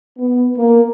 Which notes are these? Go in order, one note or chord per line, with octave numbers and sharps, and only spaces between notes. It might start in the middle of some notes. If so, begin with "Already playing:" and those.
B3
A#3